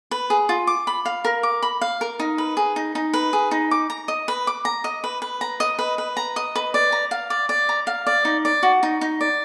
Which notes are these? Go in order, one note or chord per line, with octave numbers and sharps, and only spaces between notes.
B4
G#4
F4
D6
B5
F5
A#4
D6
B5
F5
A#4
D#4
B4
G#4
D#4
D#4
B4
G#4
D#4
D6
A#5
D#5
B4
D6
A#5
D#5
B4
B4
A#5
D#5
B4
B4
A#5
D#5
B4
D5
A#5
F5
D5
D5
A#5
F5
D5
D#4
D5
F#4
D#4
D#4
D5